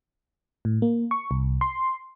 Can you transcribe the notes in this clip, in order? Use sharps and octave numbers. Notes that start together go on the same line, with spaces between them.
A2
A#3
C#6
C2
C6